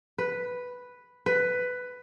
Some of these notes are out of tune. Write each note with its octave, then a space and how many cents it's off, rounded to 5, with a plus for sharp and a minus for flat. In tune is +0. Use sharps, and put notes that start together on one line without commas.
B4 +0
B4 +10